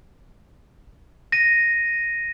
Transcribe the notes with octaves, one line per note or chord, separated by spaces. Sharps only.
A#6 D#7